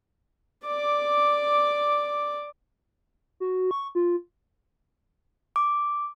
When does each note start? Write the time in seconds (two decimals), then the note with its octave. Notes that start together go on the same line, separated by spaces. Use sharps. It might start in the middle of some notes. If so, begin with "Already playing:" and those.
0.66 D5 D6
3.40 F#4
3.71 C#6
3.95 F4
5.56 D6